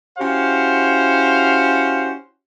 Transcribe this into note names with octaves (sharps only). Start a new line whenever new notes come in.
C#4 E4 F#4 G4 C5 F5